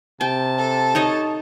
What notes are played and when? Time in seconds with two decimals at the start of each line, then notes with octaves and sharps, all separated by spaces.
0.21 C3 G5 A5
0.57 A4
0.95 D#4 C#5 D#5